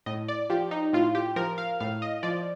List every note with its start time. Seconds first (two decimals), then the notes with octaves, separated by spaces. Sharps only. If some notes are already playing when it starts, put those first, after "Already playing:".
0.06 A2 D#5
0.28 D5
0.50 F3 G4
0.71 D#4
0.93 A2 F4
1.15 G4
1.36 F3 A#4
1.58 F5
1.80 A2 F5
2.02 D#5
2.23 F3 D5